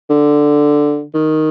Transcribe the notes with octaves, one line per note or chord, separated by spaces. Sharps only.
D3
D#3